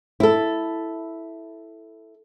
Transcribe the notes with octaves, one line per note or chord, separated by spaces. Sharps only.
E4 A4